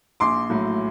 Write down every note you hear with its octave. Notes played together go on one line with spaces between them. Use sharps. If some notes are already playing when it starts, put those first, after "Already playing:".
A#1 C6 D6
A2 F#3